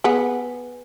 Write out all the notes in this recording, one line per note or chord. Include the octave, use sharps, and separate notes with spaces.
B3 G#4